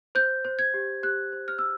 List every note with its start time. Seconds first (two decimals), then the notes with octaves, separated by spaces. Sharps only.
0.15 C5 G6
0.45 C5
0.59 G#6
0.74 G4
1.03 G4 F#6
1.32 C5
1.48 F6
1.58 E6